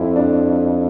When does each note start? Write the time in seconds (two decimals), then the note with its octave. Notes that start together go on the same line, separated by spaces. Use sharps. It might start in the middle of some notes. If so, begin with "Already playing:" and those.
Already playing: F2 E4
0.16 D4